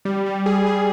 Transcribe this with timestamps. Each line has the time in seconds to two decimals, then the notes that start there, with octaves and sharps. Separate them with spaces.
0.05 G3
0.26 G3
0.46 G#4
0.66 G#4